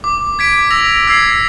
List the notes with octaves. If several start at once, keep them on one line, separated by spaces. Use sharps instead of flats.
D6
G#6 B6 D7
E6 A#6 F7
E6 G#6 C7